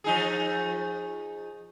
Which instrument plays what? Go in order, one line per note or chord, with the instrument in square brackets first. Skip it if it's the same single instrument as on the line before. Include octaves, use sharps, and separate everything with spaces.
[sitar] F3 D#4 G#4